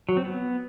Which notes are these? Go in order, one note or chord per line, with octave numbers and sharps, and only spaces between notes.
F#3
C4
B3